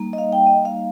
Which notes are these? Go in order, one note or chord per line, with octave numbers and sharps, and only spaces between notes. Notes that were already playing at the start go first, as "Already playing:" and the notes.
Already playing: G3 A#3 D#4
D#5
F5
G5
D#5
F5